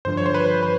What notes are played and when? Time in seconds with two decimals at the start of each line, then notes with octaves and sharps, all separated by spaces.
0.05 G2 D3 F3 C5
0.17 C#5
0.26 C5
0.34 B4
0.63 B4